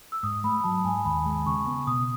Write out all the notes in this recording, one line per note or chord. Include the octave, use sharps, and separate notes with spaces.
E6
G#2 D#6
A3 B5
F#3 A5
G#2 G#5
D#2 B5
G#3
C#3 C#6
B3
B2 D#6